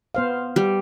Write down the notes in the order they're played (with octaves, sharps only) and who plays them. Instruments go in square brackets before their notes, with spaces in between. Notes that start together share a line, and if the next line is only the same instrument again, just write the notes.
[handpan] B3 C5 F5
[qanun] G3